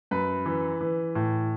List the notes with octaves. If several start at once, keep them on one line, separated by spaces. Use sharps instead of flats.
F#2 B4
E3
E3
A2